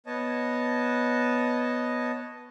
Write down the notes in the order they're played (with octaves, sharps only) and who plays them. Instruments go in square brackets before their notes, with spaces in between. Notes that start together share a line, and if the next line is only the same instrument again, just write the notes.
[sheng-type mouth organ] B3 C#5 D#5 A5